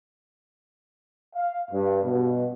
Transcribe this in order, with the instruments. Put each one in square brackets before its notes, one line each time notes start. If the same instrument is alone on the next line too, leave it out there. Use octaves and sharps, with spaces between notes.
[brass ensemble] F5
G2
B2